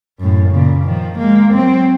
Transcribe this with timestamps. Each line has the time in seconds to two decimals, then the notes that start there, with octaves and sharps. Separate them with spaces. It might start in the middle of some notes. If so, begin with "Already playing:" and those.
0.19 F#2 A2
0.50 A#2 C#3
0.84 D#3 F3
1.19 G#3 A#3
1.54 F#3 C4